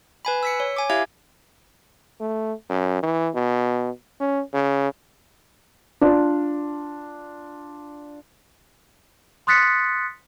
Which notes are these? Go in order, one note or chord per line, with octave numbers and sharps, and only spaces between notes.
B4 G#5 B5
E6 B6 C#7
C#5
G#5 D6
E4 G4 E5 F5 D6 G#6
A3
F#2
E3
B2
C#4
C#3
D4 F4 D5
C6 D#6 F#6 A6 B6 C#7